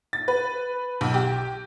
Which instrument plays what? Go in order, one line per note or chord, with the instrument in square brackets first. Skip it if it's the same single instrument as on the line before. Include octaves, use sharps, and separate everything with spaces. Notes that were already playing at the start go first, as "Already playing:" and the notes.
[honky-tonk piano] A6
B4
B1
G4